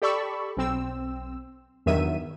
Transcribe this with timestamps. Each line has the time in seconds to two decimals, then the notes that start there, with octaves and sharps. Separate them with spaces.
0.02 G4 A4 D5 B5 C#6 E6
0.57 B1 C4 E6
1.86 E2 G2 D#3 F#3 E5 D#7